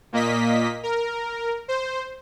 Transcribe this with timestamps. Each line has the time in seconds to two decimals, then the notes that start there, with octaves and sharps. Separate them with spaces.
0.13 A#2 A#3 D#5 B6
0.83 A#4
1.68 C5